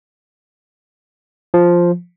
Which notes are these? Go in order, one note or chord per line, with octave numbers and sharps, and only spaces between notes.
F3